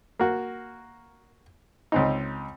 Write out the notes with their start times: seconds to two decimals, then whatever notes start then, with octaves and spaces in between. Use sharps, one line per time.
0.19 A#3 F#4
1.92 C#2 C4 D#4